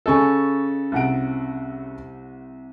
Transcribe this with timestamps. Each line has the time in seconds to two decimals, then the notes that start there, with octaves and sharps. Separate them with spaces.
0.06 C#3 A4 D#5 G#5 C#6
0.92 C2 F#5 D7